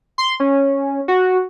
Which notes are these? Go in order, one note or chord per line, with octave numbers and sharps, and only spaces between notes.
C6
C#4
F#4